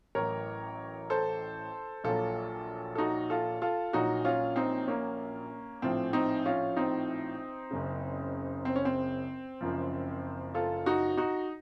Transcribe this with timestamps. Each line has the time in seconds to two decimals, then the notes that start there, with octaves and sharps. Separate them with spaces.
0.15 A1 A2 F#3 A#4 C#5
1.10 A4 C5
2.04 A#1 A#2 F#3 F4 A4
2.95 A4
2.98 D#4 F#4
3.30 F4 A4
3.62 F4 A4
3.93 A#1 A#2 F#3 D#4 F#4
4.25 C#4 F4
4.56 C4 D#4
4.88 A#3 C#4
5.82 A#1 A2 F3 C4
6.13 C4 D#4
6.46 C#4 F4
6.77 C4 D#4
7.71 F#1 F#2 C#3
8.65 C4
8.76 C#4
8.85 C4
9.61 F#1 F#2 F3
10.54 F4 A4
10.86 D#4 F#4
11.17 D#4 F#4